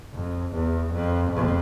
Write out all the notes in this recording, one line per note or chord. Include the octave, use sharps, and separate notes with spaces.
F2
E2
F2
F2